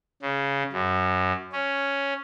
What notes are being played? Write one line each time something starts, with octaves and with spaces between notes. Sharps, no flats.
C#3
F#2
C#4